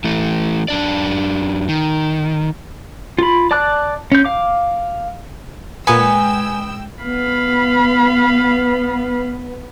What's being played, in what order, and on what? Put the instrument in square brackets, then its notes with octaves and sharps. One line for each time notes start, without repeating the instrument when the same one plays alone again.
[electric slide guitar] E3 A3
F#2 D4 D5
D#3
[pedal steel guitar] F4 B5
D5 A5 D6 F#6
C#4 G6
F5 D6
[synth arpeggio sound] A#2 C#7 [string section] G#3 G5 E6 [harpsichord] B3 [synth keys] G#5
[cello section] B3 [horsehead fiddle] F5 B5